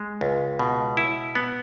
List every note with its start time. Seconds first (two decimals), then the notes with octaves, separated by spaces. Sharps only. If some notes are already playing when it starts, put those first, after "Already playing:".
Already playing: G#3
0.21 C#2
0.59 B2
0.97 E4
1.35 B3